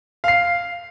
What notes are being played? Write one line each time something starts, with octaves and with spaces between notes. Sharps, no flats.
F5 C7